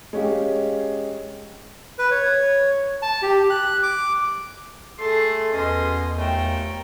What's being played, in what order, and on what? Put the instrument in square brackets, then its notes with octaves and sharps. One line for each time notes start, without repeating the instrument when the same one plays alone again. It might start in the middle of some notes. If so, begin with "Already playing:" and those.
[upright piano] G#3 C#4 G4 F5
[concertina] B4
C#5
A5
G4
F#6
D6
[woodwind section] A3 C6 [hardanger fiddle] G#4 A4
[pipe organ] E2 [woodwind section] B2 C#4 [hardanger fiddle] D#5 C6
[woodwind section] D#2 A#2 A3 [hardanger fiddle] A#4 G5